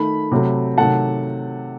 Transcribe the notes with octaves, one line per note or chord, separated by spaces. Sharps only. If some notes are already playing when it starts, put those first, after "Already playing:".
Already playing: D#3 A3 B5
C3 F#3 A3
C3 D#3 F#3 A3 F#5 A5